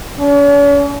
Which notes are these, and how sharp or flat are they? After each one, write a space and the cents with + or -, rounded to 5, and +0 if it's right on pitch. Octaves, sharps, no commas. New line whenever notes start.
C#4 +45